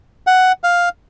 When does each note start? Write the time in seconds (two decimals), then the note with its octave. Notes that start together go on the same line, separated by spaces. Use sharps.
0.27 F#5
0.64 F5